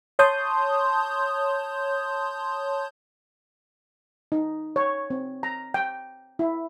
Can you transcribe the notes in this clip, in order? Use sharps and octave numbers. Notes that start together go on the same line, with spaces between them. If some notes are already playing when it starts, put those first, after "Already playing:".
C#5 A5 C6 D#6 G6
D#4
C#5
C4
A#5
G5
E4